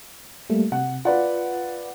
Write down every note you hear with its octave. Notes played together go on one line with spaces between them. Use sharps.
G3 A3 A#3
C3 F#5
F4 B4 D5 F#5